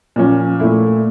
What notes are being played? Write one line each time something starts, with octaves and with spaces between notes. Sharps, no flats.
A#2 F3 C#4
A#2 A3 E4